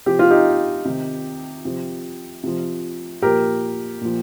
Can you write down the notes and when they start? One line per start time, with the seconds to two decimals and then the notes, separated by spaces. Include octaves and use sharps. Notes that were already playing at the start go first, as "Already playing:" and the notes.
0.06 C3 F3 G4
0.19 F4
0.31 D#4 G4
0.85 C3 D#3
1.65 C3 F3
2.43 C3 F3
3.22 A#2 F3 G4 A#4
4.01 A#2 F3